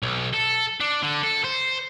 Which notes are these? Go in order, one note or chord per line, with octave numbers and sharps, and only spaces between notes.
B1
A4
D4
D3
A4
C5